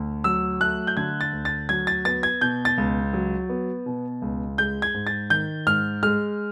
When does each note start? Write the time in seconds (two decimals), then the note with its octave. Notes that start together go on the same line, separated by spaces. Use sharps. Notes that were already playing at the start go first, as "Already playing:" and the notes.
Already playing: D2 D3
0.24 F#3 E6
0.60 A3 F#6
0.87 G6
0.97 D3 G#6
1.21 A6
1.33 D2
1.45 A6
1.69 F#3 G#6
1.87 A6
2.05 B3 A6
2.23 G#6
2.41 B2 G6
2.65 A6
2.78 C#2
3.13 F#3
3.50 B3
3.86 B2
4.22 C#2
4.58 G#3 G6
4.82 G#6
4.94 G#2
5.07 A6
5.30 D#3 G6
5.66 G#2 F6
6.03 G#3 F6